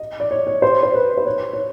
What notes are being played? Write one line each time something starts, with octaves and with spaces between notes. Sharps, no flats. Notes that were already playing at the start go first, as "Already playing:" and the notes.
Already playing: D#5
D5
C#5
C#5
C5
C5
B4
C5
C#5
C#5